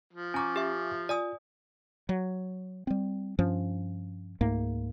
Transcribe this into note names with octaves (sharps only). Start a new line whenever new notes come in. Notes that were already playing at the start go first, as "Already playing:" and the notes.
F3
C#4 G#5 A#5 C#6 D6
G4 E5
F4 D5 G#5 D#6
F#3
G3 C4
G2 F3 C#4
C#2 G#2 A3 A#3